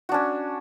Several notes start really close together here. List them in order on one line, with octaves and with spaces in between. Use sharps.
F#4 D4 C#4